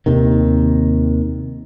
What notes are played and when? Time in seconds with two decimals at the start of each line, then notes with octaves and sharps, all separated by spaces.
0.06 D#2 C3 D#3